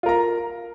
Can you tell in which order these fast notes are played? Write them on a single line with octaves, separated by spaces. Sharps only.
F4 A#4 A#5